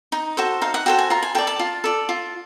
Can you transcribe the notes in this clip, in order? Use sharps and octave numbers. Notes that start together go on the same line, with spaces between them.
D#4
F#4 A4 C5
D#4 F5
F#5
F#4 A4 C5 G5
G#5
F4 A#5
G#5
A4 D5 G5
A5
F4
A4 D5
F4